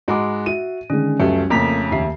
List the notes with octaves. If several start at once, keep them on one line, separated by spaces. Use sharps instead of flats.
G#2 G#3 F#4 A#5 B5 D6
F#4 E5 D#7
D3 D#3 G#3 C#4
C#2 F#2 G3 A3
F2 C#3 A3 A#3 A#5 B6
D#2 E5 C7